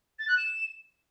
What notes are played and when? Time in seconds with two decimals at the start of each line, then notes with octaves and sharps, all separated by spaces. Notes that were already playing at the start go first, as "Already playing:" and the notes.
0.19 A6
0.28 F#6
0.37 E7